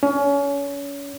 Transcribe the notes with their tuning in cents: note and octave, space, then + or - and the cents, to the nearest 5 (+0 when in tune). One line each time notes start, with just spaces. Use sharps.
C#4 +30